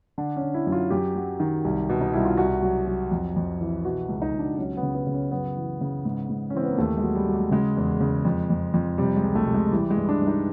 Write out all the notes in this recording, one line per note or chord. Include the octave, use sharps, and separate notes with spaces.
D3 D4
C#4
D3
E4
F#2
F4
F#2 G4
F#3
D#3
C2
B2
D#4
C2 E4
F4
C2 F#4
F#3
F#3
F2
F2
E3
B2 F#4
C#2
D#4
C#2
D4
F#3 C#4
B3
C#3
B3
C#3
C#4
F#2 B3
E3
C#3
G#2
G#2
C#4
E3 C4
B3
A#3
D#2 A3
F#3 G#3
G3
F#3
G#3
C#3 G#3
E2
C#3
F2
F2
F2
C3 G3
G#3
C#2
A3
C3
G#3
E3 G3
G#3
G2
D4
G2
D#4